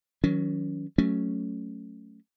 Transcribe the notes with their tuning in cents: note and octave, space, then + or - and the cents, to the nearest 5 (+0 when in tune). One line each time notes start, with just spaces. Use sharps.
D#3 +35 F#3 +0 C#4 +25
F#3 +0 A3 +0 C#4 +0